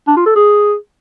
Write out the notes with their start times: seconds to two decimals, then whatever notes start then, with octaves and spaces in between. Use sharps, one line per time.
0.07 D4
0.17 F4
0.26 A4
0.35 G#4